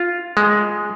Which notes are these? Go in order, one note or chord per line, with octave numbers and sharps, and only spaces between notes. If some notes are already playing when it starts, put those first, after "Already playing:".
Already playing: F4
G#3